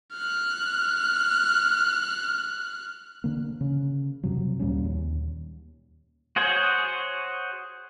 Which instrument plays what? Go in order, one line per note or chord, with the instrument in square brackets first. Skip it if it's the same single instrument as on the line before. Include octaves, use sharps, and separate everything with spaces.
[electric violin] F6 F#6
[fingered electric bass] D3 A#3
C#3
F2 C3 F#3
D2 A#2 G3 C#4
D#2
[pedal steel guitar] F#4 G#4 C5 C#5